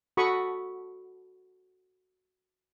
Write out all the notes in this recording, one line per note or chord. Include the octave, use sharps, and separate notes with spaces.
F#4 A4 B5 C#6 D#6